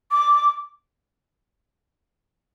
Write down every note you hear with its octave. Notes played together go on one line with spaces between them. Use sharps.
D6